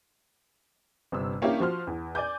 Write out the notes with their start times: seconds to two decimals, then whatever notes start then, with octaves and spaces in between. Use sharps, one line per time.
1.12 G1 C3 E6
1.42 A#3 C#4 D4 E4 G4
1.60 F3 F#4 C6 F6
1.87 E2
2.15 D5 G#5 D6 G6